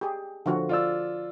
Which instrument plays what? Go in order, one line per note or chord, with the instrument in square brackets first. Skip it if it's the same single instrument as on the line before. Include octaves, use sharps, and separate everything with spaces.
[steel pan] G4 G#4
D3 F3 F#4
[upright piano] F4 D5 E6